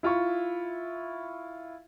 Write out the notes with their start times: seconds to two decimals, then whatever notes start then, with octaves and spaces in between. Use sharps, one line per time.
0.03 E4 F4 E5 C#6